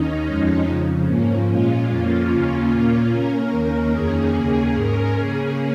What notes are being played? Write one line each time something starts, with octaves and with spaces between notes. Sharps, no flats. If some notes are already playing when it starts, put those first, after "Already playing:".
Already playing: D#2 D#3 C#4 D#4
F2 F3 G#3 C#4
F2 C#3 F3
G#2 F3 A#3 C#4
A#2 G#3 C#4 F4
F2 F3 A#3 C#4
D#2 C#3 A#3 C#4
A#2 A#3 C#4 F4
C#3 A#3 C#4 A#4
D#2 D#3 A#3 C#4
F2 D#3 A#3 C#4 G#4
D#2 C#3 A#3 C#4
G#2 G#3 C#4 A#4
C#3 A#3 C#4 G#4